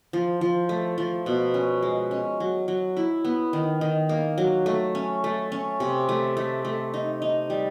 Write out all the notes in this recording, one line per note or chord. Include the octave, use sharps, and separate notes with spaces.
F3
F3
A3
F3
B2
C#4
G#3
C#4
F#3
F#3
E4
B3
D#3
D#3
A#3
F#3
A3
C#4
A3
C#4
C3
A3
A3
A3
D#4
D#4
G3